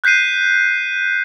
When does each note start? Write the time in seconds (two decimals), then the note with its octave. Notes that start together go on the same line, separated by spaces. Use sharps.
0.04 F#6 G6 B6 C7 D#7